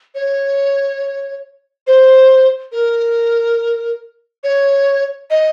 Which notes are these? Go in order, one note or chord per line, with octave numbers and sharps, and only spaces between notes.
C#5
C5
A#4
C#5
D#5